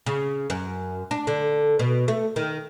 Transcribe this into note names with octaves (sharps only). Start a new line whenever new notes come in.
C#3
F#2
D4
D3
B2
A3
D#3